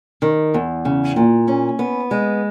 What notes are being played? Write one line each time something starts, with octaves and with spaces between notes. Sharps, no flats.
D#3
E2
C#3
A#2
C#4
B3
G#3